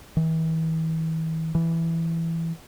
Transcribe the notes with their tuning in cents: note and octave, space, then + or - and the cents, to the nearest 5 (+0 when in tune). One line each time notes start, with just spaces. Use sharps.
E3 -40
E3 +5